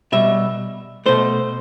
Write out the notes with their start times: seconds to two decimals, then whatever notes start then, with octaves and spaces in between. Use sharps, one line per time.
0.12 B2 G3 E5
1.06 B2 A3 C5